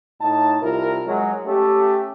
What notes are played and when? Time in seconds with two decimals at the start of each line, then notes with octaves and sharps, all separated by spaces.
0.22 A2 D#4 A5
0.62 C2 C3 E4 F4 A#4
1.07 F#3 G#3
1.47 A3 C#4 G4